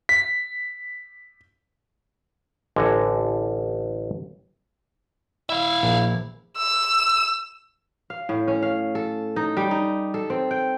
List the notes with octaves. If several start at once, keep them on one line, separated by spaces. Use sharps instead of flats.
B6
A1 D3 D#5 F#5 G#5
E4 E5 F5
A#1
E6
F5
A2
C#4
F5
A4
D#4
G3
D#4
A4
C4
G5